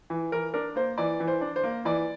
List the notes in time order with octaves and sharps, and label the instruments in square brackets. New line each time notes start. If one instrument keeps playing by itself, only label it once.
[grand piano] E3
E3 A#4
D4 A#4
A#3 C5
E3 D5
E3
C5
D4
C5
A#3
E3 D5